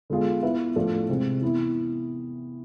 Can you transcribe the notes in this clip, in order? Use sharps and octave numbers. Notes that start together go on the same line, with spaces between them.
D3 G#3 B3 F4 G#4
B3 E4 B4 E5
A2 F3 A3 D4
C3 G#3 C4
E3 B3 E4